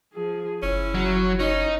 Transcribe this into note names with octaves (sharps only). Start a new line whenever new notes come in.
F3 G#4
F#1 C#4 E4
F#3
C#4 D#4